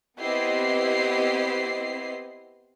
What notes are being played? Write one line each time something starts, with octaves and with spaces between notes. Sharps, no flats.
B3 C4 E4 G4 D#5 C7